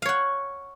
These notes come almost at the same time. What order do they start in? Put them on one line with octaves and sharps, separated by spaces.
F5 C#5 F#5